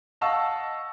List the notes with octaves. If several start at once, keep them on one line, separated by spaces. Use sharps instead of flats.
D#5 F5 F#5 A5 C#6 E6